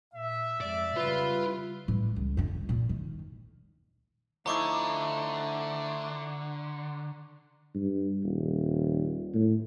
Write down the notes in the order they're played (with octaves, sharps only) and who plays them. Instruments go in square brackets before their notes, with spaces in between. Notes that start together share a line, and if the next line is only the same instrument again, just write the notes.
[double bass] A#2 [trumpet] E5
[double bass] F2 G#3 [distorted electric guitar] D5
[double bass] C#3 G3 [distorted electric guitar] F4 [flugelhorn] B4
[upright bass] A2 G3
C#2
F2 D3
A2
A#2
D#3
[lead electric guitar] D3 [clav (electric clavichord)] F3 D#4 E4 [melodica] A3 [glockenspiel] A#5 C#6 D6
[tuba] G2
D#1
A2